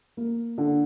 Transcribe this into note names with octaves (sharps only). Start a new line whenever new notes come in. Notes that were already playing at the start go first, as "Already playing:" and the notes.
A#3
D3